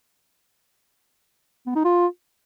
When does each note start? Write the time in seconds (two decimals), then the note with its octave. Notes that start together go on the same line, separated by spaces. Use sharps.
1.66 B3
1.75 D#4
1.84 F4